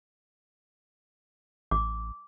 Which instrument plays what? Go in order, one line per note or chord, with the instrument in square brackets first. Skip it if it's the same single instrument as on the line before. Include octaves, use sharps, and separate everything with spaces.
[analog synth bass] A1 [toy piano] D6